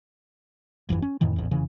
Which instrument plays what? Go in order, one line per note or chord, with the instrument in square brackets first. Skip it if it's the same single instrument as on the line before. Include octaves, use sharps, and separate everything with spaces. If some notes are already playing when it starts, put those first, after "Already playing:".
[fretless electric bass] G1 F2 A#2 E3
C#4
F2 A2 D#3 E3
A1 E2
F1 C#3 E3